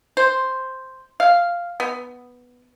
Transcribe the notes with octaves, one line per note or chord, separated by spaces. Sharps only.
C5
F5
B3